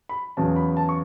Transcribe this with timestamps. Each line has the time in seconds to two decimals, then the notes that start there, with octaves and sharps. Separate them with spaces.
0.09 B5
0.37 E2 C#3 F#3 A5
0.56 B5
0.77 A5
0.89 C#6